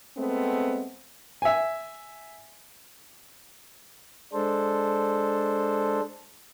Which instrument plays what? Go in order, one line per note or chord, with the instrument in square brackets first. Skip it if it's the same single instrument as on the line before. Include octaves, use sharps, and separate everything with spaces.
[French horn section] G#3 A3 B3 C4
[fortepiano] E5 G#5
[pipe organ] G#3 D4 A4 C5